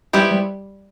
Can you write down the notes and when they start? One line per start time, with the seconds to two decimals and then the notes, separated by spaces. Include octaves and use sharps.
0.13 G3 B3 E4 G4 C5
0.31 G3